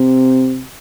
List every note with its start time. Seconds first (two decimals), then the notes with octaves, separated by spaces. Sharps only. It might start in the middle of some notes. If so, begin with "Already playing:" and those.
Already playing: C3